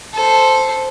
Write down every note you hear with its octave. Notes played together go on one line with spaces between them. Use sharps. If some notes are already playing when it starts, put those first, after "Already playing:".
A4 C5